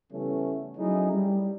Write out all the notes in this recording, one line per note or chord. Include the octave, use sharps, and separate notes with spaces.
C#3 E3 G3 A3 B3 C#4
F#3 A3 C#4 D#4 E4 G#4
G3